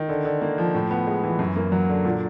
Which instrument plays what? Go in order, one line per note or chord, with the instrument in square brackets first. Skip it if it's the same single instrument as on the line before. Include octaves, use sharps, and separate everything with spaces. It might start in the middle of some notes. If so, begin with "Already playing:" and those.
Already playing: [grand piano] D#3
D3
D3
A#3
F3
A2
B3
G#3
E3
F#2
A#3
F#3
D3
A#2